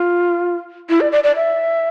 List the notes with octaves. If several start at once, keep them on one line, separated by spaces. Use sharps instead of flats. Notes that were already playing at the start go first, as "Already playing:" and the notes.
Already playing: F4
E4
D5
D5
D5
E5